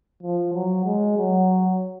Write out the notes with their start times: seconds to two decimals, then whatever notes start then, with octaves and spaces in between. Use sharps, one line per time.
0.23 F3
0.53 F#3
0.85 G#3
1.18 F#3